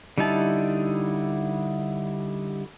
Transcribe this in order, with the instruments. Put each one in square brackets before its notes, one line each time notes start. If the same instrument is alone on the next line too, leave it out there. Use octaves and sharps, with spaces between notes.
[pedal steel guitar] D3 G3 D#4 E4 A5